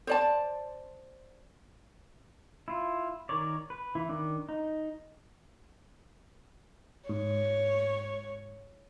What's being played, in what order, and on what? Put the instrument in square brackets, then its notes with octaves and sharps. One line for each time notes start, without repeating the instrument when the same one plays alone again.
[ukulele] C5 D5 A5
[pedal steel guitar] E4 F4
D#3 A#4 C#5 D5
B4
E3 E4
D#3 D4
D#4
[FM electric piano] G#2 [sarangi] C#5